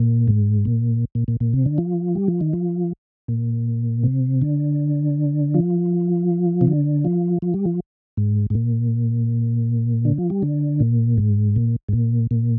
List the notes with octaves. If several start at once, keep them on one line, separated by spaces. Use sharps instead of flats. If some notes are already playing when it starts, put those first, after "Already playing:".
Already playing: A#2
G#2
A#2
A#2
A#2
A#2
C3
D3
F3
G3
F3
D#3
F3
A#2
C3
D3
F3
C3
D3
F3
F3
G3
F3
G#2
G#2
A#2
D3
F3
G3
D3
A#2
G#2
A#2
G#2
A#2
A#2